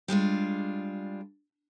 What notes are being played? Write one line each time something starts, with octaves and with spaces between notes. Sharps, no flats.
G3 G#3 D4 F4